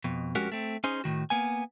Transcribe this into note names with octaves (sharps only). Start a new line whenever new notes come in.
F2 B2
F2 G#3 C#4 F#4 G4 A#4
A3 C4
C#4 D#4 G#4 C5
A2 D#3 F#4
A#3 B3 G#5